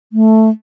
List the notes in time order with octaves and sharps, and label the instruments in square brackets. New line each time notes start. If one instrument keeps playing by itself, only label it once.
[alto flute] A3